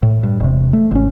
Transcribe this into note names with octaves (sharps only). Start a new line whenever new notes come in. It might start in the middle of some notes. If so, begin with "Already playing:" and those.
A2
G2
E1 C3
A3
G#1 C#4